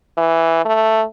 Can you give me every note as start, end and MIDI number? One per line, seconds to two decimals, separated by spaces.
0.17 0.63 52
0.65 1.03 57